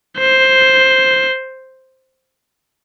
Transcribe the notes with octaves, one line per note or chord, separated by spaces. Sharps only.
C5